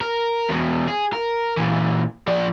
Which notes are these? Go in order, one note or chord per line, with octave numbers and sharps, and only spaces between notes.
A#4
E2 B2
G#4
A#4
A#2 E3
F3 D5